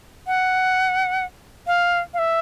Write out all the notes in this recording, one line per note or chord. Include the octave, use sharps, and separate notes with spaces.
F#5
F5
F5
E5